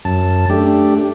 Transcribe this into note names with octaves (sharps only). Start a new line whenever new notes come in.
F#2 A5
A3 D4 G4